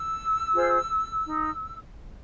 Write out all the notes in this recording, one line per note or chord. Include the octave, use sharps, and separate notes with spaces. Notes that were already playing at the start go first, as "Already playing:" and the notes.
Already playing: E6
F4 G#4 C5
D#4